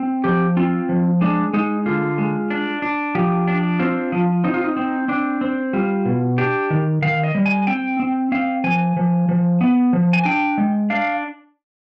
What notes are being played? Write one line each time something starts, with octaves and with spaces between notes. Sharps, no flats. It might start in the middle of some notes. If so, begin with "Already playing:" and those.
Already playing: C4
F3 G4
C4 F4
F3
G#3 D4
G#3 D#4
D3 F4
G#3
D4
D4
F3 G4
D4
C4 F4
F3
C4 D#4
F4
D#4
C4
C4 D4
C4
G3 F4
B2
D4 G4
D#3
D#3 F5
D#5
G3
G#5
C4 G5
C4
C4 F5
F3 G#5
F3
F3
B3
F3
G#5
D4 G5
G#3
D4 F5